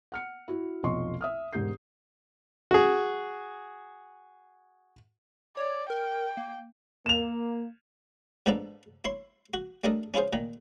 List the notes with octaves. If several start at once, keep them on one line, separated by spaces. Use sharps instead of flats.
F#5 F6 C#7
E4 F#4
F1 B1 F3 D#5 C6 C#6
E5 D#6 F6
E1 G#2 G4 A#4 G6 C7
F#4 G#4
C#5 D5
A#4 G5
A#3
A#3 E7 F7
G#2 F3 B3 D4 A4 A#5
E4 C#5 C6
F#4
G3 A3 D4 A4 A#4 D#5
C#4 E4 F4 G#4 C5
A#2 D#3